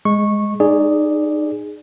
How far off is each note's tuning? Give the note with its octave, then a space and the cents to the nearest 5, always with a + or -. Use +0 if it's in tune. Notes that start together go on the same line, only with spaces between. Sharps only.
G#3 +0 C#6 -15
D#4 -25 G#4 +0 D5 +0